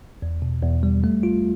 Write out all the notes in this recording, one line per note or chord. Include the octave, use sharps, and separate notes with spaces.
E2
B2
E2
G3
A3
F4